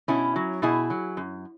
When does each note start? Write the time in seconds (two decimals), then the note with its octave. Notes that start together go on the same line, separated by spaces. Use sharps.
0.08 B2 C#4 E4
0.36 F#3
0.62 B2 E4 G#4
0.90 F#3
1.17 F#2